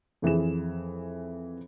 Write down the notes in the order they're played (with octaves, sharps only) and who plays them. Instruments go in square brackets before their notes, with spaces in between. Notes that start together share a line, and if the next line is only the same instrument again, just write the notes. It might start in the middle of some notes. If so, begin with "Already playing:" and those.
[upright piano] F2 E3 G#4 E7